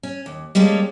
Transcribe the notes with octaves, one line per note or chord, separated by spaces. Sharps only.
C#4
D#2
G3 G#3 A#3 C#4 A4